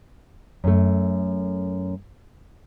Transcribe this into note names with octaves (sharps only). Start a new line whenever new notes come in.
F#2 A3